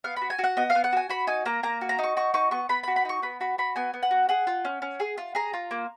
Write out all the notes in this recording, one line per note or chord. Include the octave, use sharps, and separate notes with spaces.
B3 F5
F#4 B5
G#5
F#4 F#5
B3 D#5
F5
B3
F#5
F#4 G#5
F#4 B5
D#4 G#5
A#3 A#5
A#3 A#5
F#4
A#5
D#4 C#6
F#4 C#6
D#4 C#6
B3 C#6
B3 B5
B5
F#4
B5
D#4 C#6
B3 B5
F#4 B5
F#4 B5
B3 G#5
B3
F#5
F#4
G#4 F#5
F4
C#4
C#4
G#4
F4
G#4 A#5
F4
A#3